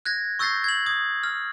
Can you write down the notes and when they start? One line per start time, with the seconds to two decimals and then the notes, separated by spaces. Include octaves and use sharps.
0.05 F#6 G#6 A#6
0.39 C#6 E6 G6 A6 A#6 C7
0.64 G#6 F#7
0.86 D#6 G#6
1.23 F6